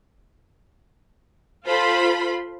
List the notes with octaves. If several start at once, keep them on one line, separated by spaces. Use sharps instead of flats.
F4 A4 C5 B5 C6